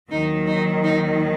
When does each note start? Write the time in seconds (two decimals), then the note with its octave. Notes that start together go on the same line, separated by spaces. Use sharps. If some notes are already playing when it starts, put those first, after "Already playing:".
0.11 D#2 D#3 F#3 D#4
0.47 D#4
0.84 D#4